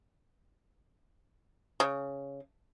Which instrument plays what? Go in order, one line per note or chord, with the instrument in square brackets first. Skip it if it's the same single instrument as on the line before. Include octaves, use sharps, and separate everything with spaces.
[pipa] C#3